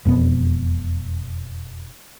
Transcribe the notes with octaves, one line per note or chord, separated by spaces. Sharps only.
E1 F2 B2 B3